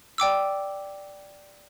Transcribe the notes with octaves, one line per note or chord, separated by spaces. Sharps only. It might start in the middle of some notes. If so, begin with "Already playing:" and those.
D5 G5 D6 E6